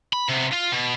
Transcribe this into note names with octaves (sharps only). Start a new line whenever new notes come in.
B5
C3 B3
F4
B2